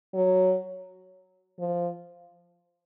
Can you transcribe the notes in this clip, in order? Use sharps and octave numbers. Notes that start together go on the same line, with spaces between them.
F#3
F3